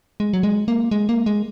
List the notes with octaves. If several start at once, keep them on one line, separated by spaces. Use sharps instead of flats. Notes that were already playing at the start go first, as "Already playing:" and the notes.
G#3
F#3
G#3
A#3
G#3
A#3
G#3